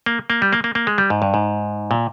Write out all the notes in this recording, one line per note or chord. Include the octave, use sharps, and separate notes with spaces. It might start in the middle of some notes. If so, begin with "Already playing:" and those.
A#3
A#3
G3
A#3
A#3
A#3
G#3
G3
G#2
G2
G#2
A#2